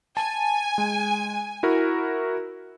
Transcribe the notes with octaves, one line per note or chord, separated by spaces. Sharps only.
G#5 A5
G#3
E4 F#4 A#4